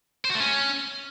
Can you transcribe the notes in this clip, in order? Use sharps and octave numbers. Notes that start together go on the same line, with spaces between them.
C5
F#4
A3
C#4